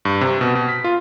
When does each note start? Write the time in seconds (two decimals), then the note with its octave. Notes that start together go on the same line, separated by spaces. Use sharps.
0.05 G2
0.21 C3
0.41 B2
0.55 B2
0.69 B6
0.84 F4